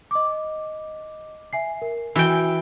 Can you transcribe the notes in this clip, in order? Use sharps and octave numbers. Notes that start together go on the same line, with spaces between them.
D#5 D6
E5 G#5 C7
A#4
E3 F#4 G5 G#5 E6